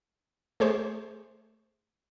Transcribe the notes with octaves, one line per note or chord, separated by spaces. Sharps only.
A3 G#4 C5 C#6